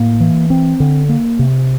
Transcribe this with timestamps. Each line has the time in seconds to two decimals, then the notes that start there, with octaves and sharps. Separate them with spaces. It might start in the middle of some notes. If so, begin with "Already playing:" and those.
Already playing: A2 A#3
0.20 E3
0.50 C4
0.80 D3
1.09 A#3
1.39 C3